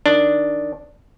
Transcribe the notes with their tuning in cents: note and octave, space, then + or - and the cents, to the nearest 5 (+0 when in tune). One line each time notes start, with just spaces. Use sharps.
D#3 +0 D4 +0